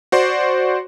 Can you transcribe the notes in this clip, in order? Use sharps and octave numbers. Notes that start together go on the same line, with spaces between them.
F#4 C5 D5 C6